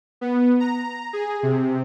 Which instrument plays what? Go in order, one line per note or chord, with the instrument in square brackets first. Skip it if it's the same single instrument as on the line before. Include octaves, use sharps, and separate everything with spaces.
[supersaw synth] B3
A#5
G#4
C3